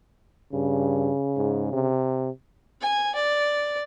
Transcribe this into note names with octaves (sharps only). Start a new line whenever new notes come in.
G2 C#3
G#2
C3
G#5
D5